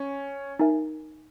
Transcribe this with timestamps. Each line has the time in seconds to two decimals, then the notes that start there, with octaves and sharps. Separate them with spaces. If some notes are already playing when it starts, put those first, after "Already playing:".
Already playing: C#4
0.59 D#4 A#4 E5 G#5